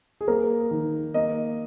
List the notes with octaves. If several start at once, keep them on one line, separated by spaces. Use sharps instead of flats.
G#4
A#3 A#4
D#3
A#3 D#5